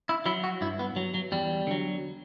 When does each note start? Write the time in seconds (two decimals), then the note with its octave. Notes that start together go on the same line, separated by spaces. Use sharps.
0.09 E4
0.26 F#3 E4
0.44 F#4
0.61 G2 E4
0.79 B3
0.96 F#3
1.14 F#3
1.32 E2 G3
1.67 D3 F#3